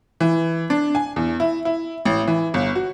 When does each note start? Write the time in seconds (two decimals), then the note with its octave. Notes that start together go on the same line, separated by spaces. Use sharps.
0.20 E3
0.70 D4
0.95 G#5
1.16 E2
1.40 E4
1.65 E4
2.05 A1
2.27 E3
2.54 G1
2.75 F#4